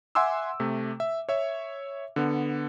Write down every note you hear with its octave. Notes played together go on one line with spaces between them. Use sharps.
E5 F#5 G#5 C6 D6 E6
C3 A3
E5
C#5 E5
D3 B3